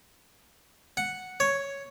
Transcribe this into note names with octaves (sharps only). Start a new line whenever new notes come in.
F#5
C#5